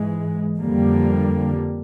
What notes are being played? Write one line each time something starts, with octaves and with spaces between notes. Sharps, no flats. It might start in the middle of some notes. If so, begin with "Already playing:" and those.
Already playing: G#2 E3 G#3
F2 D3 G3 A#3